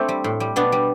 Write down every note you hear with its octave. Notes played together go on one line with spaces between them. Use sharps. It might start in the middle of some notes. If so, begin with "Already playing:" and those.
Already playing: A3 C4 D4 E4
G3
A2
G3
B2 B3 D4
G3